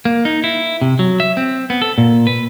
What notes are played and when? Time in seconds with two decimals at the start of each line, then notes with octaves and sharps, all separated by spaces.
0.05 A#3
0.25 D#4
0.44 E4
0.82 C3
0.99 F#3
1.20 E5
1.37 C4
1.70 B3
1.82 A4
1.98 A#2
2.27 B4